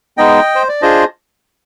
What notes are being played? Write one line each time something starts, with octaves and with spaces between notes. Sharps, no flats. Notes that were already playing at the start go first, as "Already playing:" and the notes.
G#3 B3 D#4 D#5 G5
C5
D5
D4 F4 G#4 C5 D#5